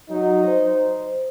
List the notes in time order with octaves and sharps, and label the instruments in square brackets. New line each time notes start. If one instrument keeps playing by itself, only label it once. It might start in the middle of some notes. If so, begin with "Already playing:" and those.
[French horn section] F#3 [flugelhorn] D#4
[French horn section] C5